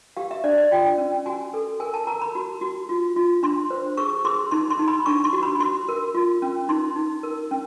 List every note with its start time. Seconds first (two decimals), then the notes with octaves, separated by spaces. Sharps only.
0.17 G4 F5
0.31 E5
0.44 D4 D5
0.58 D5
0.71 F4 G5
0.98 C#4
1.26 F#4 G#5
1.54 A4
1.80 A#4 G#5
1.94 A5
2.07 A#4 A#5
2.22 B5
2.35 F#4
2.61 F#4
2.89 F4
3.16 F4
3.43 D4 C6
3.70 C5
3.97 G#4 C#6
4.25 G#4 C6
4.51 D#4 C6
4.70 C6
4.79 D#4
4.88 B5
5.06 D4 C#6
5.24 C6
5.33 F#4
5.43 B5
5.60 F#4 C6
5.88 A#4
6.15 F4
6.42 C#4
6.69 D#4 C6
6.96 D#4
7.23 A#4
7.51 C#4